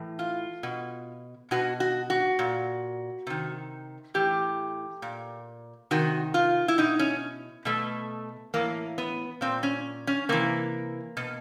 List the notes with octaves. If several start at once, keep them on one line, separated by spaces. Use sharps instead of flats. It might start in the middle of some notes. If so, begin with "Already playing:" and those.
Already playing: A2 E3
F4
B2
B2 F#4
F#4
F#4
A#2
C3 D#3
A2 E3 G4
A#2
C3 D#3 F#4
F4
E4
B2 D#4
C#4
B2 A3
A2 E3 A#3
B3
A#2 C4
C#4
C#4
C3 E3 A#3
B2